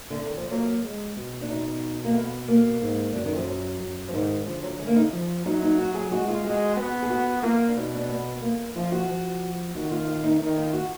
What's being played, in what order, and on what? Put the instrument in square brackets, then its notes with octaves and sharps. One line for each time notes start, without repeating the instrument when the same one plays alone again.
[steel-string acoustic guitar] D3
D#3
F3
[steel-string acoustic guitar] F#3 [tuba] A#3
[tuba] G#3
B2
[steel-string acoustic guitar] D4
[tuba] B2 [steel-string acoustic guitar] D#4
[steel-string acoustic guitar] A#3
B3
A#3
[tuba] G#2
[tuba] F#2 [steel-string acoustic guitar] D3
[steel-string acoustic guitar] D#3
F3
F#3
[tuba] F#2
[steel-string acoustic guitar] F3
[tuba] G#2 [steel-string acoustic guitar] D#3
[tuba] D3 [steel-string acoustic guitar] F3
[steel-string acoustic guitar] F#3
G#3
A#3
D#4
[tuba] F3
[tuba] F#3 [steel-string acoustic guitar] D#4
[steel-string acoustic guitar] D#4
F#4
G#4
[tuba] G#3 [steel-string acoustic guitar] F#4
[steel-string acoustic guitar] F4
[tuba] G#3 [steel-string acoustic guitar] F#4
[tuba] B3
[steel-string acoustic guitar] G#4
F#4
[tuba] A#3 [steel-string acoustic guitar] F4
[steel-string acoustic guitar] D4
[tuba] B2 [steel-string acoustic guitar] D#4
[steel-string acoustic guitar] D4
B3
A#3
[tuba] F3 [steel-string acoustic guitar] F4
[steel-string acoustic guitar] F#4
[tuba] F3
[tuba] D#3 [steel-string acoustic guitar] F#4
[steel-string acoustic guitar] F4
F4
D#4
[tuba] D#3 [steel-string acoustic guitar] D#4
[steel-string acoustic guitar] F4
F#4